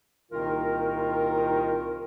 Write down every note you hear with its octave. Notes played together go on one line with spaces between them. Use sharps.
C2 A#2 D#3 F4 A#4